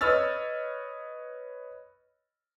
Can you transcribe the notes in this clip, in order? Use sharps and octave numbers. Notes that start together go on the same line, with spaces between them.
B4 C#5 D#5 E6 F6 A6